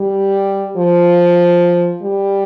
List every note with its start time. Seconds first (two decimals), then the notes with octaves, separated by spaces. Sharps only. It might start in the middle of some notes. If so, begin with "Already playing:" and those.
Already playing: G3
0.77 F3
2.02 G3